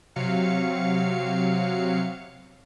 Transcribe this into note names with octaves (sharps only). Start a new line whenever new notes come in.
C3 F#3 F5 C#7